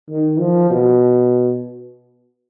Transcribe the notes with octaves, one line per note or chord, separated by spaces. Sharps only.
D#3
F3
B2